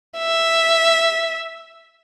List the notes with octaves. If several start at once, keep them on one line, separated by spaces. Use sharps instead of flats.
E5